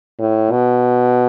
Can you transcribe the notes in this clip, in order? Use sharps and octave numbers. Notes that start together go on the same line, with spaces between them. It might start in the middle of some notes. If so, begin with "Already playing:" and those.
A2
B2